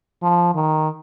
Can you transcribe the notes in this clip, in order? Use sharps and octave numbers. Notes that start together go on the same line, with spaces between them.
F3
D#3